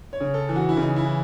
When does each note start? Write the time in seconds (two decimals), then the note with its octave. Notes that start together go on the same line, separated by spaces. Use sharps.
0.13 C#5
0.21 C#3
0.34 A4
0.49 E3
0.56 F#4
0.69 E4
0.77 C#3 D#4
0.96 E4
1.05 E3